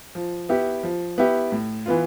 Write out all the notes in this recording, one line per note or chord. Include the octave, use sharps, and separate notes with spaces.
F3
B3 E4 G4
F3
B3 E4 G4
A2
E3 B3 F4